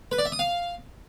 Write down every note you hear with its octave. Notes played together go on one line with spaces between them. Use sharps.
B4
D5
E5
D#6
F5